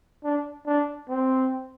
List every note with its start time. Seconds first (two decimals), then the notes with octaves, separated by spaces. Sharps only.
0.24 D4
0.66 D4
1.08 C4